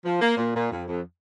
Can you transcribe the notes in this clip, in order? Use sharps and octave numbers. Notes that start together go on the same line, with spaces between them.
F3
A#3
A#2
A#2
F2
F2